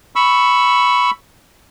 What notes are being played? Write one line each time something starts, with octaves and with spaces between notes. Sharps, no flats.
B5 C#6 E6